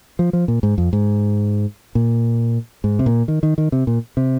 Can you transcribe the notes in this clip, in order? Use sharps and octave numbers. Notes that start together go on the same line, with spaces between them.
F3
F3
A#2
G#2
F2
G#2
A#2
G#2
C3
A#2
D#3
D#3
D#3
C3
A#2
C3